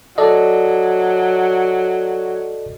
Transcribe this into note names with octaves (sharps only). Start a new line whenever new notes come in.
F#3 A4 D5 D#5